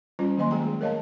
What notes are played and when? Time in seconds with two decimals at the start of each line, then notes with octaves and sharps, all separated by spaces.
0.19 G3 C#4 F4 C5 A#5
0.37 D#3 F#3 A#3 D#5 G#5 C6
0.51 G#3 G#4 D5 G5 A#5
0.64 A3
0.81 A#4 C#5 D#5 F5 G5 A5